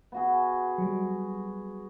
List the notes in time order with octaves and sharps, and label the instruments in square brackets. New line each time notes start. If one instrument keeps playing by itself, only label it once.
[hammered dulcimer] B3 F#4 G#4
[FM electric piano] F#3 G3